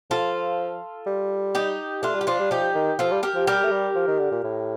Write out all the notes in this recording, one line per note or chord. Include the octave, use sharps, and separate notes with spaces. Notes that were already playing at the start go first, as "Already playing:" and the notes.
F3 F4 A4
G3
D#4 G4
A3 D4 F4
G3
G4
F3 D4 F4
G3
F3 D#4 G4
D#3
F3 F4 A4
G3
G4 A#4
F3
G3 G4 A#4
A3
G3
F3
D#3
D3
A#2
A2